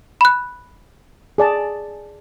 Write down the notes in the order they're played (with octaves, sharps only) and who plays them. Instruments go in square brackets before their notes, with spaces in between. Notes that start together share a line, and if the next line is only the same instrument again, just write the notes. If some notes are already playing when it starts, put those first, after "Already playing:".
[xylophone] B5 F#6
[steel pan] G#4 D5 A5